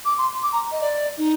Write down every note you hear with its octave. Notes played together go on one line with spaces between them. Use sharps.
D6
C6
D6
A#5
D#5
D5
D#4